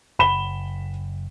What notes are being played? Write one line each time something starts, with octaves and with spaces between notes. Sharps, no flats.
F#1 B5 E7 G7